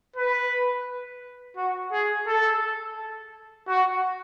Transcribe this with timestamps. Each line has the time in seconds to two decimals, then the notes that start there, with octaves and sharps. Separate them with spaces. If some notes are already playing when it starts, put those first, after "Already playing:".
0.16 B4
1.57 F#4
1.92 G#4
2.27 A4
3.68 F#4